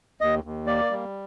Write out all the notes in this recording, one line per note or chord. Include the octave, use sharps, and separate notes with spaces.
D#2 D#5
D#2
A#3 D5
G3